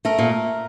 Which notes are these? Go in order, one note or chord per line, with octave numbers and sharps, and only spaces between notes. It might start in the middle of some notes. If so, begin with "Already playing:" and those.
A3 A#4
A#2